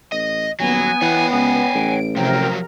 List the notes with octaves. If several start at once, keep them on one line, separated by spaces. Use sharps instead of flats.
A1 D#5
D#1 F#3 B3 G#5
E3 C#5 F#5 G5
C#2 G#5
A1 D7
C3 F3 F#3 A#4 G5 A#5